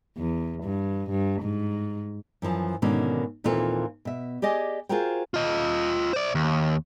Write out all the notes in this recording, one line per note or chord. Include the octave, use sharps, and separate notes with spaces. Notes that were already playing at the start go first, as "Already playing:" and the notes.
E2
G2
G2
G#2
F#2 E3 F3 A5
G#2 B2 D3 D#3 A#3 C#4
D#2 A#2 E3 C4 F4 A4
B2 E5
G4 G#4 D5 D#5 G#5
F4 F#4 G#4 A#4 C5 G5
F4 D#5
C5 D5
D#2